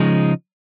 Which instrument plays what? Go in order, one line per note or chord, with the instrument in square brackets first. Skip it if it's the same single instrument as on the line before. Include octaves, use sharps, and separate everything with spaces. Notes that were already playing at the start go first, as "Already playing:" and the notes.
Already playing: [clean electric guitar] C#3 F3 G#3 D#4